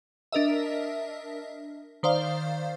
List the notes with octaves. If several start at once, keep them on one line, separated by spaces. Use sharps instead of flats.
D4 A#4 D#5 E5
D#3 C5 D5 F5